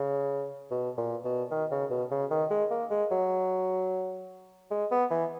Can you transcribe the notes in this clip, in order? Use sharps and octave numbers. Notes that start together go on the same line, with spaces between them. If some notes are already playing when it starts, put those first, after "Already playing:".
Already playing: C#3
B2
A#2
B2
D#3
C#3
B2
C#3
D#3
G#3
A#3
G#3
F#3
G#3
B3
E3